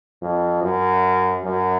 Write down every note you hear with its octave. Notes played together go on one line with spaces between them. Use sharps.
F2
F#2
F#2